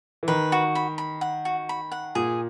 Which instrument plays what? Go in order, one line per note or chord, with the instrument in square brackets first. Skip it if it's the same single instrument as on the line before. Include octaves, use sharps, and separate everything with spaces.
[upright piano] E3
[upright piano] D#3 [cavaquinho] B4
[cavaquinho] F#4
B5
B5
F#5
F#4
B5
F#5
[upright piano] A#2 [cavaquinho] G#4